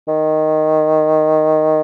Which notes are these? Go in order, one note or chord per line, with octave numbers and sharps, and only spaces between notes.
D#3